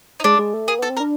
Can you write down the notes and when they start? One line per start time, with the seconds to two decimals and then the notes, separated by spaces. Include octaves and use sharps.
0.20 D#4
0.24 G#3 D4
0.39 G#3
0.54 A3
0.68 A#3 G#4
0.79 B3 A4
0.90 C4
0.97 A#4
1.00 D4